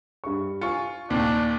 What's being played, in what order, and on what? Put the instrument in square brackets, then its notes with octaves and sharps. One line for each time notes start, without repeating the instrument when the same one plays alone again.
[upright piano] G2 C#6
[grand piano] F4 [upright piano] G#5 C#6 C#7
[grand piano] D#2 A#2 [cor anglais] D4